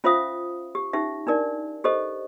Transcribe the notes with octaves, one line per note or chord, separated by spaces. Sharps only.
C#4 F4 C5 E5 F5 D#6
G4
C#4 D#4 G4 E5
D4 D#4 A#4 D5
G4 A4 C5 D#5